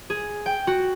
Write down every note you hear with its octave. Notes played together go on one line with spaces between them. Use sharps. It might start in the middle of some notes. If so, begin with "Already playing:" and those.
G#4
G5
F#4